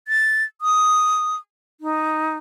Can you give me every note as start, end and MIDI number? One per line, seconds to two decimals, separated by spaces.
0.08 0.44 93
0.61 1.36 87
1.81 2.37 63